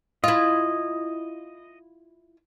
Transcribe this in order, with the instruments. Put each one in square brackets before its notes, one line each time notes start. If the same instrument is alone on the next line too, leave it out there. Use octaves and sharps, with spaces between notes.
[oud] E4 F4 [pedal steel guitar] D#5